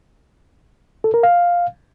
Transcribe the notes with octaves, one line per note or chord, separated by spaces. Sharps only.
A4
A#4
F5